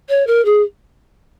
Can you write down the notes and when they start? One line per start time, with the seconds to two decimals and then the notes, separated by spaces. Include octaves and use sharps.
0.09 C#5
0.27 A#4
0.45 G#4